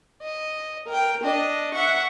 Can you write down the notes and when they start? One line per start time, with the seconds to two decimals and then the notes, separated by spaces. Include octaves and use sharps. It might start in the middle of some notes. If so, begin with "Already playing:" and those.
0.22 D#5
0.87 A#4 G5
1.24 D4 D#5
1.73 E5 F#5 C#6